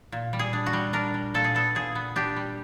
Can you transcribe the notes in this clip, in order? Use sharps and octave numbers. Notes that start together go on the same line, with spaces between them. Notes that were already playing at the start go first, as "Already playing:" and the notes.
A#2
G3
G#4
D4
F#4
G3
D4 A#4
G3
A#2 A4
G#4
B3 A4
A#2 G#4
B3
D4 G4
G3